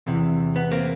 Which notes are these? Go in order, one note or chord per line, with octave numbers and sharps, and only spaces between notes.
E2 C3 E3
B3
A#3 C4